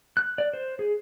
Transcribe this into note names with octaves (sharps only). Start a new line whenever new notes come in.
F#6
D5
C5
G#4